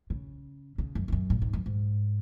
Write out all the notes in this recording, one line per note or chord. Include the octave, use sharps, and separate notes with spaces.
C#3
C#3
F#2
E2
F#2
A2
G#2
F#2
G#2